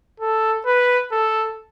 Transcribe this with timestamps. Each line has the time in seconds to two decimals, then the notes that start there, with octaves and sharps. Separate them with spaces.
0.20 A4
0.66 B4
1.11 A4